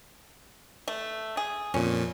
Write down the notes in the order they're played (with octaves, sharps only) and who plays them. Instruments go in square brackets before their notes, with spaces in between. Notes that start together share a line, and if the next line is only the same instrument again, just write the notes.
[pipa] A3
G#4
[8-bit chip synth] F2 A#2 [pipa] C#4